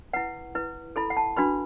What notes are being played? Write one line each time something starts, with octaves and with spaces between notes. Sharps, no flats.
E4 B4 F#5
E4 B4
E4 A4 B5
F#5
A5
D4 F#4 B4 B5